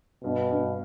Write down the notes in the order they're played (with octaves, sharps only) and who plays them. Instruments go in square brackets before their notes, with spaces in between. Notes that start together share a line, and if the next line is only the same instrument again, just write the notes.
[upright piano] G2 [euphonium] B2
[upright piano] G2